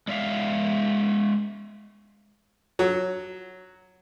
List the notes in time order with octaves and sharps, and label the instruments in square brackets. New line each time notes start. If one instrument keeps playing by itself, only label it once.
[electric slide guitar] G#3 D5 E5 F5
[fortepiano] F#3